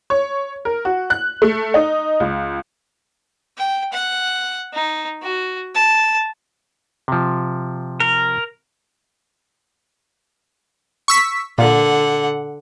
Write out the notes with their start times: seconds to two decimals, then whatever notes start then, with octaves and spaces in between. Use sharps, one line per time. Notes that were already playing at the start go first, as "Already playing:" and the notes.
0.10 C#5
0.65 A#4
0.85 F#4
1.10 F#6
1.42 A3
1.74 D#4
2.20 C#2
3.57 G5
3.92 F#5
4.73 D#4
5.22 F#4
5.75 A5
7.08 C3 F3
8.00 A#4
11.08 C#6 E6 B6
11.58 A#2 D3 F#5